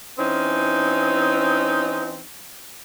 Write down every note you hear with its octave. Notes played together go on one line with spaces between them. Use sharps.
E3 C4 C#4 D#4